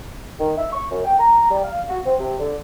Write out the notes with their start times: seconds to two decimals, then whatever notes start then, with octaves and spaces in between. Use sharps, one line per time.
0.39 D#3
0.58 E5
0.73 C#6
0.91 F#2
1.05 G5
1.19 A#5
1.51 G3
1.64 F5
1.89 F#4
2.06 C4
2.19 C3
2.40 D3